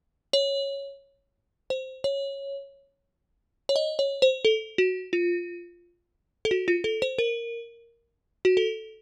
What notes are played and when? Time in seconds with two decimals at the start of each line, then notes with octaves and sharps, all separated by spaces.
0.33 C#5
1.70 C5
2.04 C#5
3.69 C#5
3.76 D#5
3.99 C#5
4.22 C5
4.45 A4
4.78 F#4
5.13 F4
6.45 A4
6.51 F#4
6.68 F4
6.84 A4
7.02 C5
7.18 A#4
8.45 F#4
8.57 A4